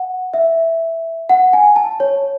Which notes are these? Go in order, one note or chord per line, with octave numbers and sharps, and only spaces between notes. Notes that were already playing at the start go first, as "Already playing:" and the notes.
Already playing: F#5
E5
F#5
G#5
A5
C#5